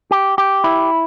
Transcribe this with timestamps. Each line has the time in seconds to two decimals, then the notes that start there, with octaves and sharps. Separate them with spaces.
0.11 G4
0.38 G4
0.64 E4